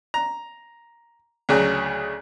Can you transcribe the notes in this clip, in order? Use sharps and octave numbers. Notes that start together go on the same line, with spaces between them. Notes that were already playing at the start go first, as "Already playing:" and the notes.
A#5
D2 C#3 F#3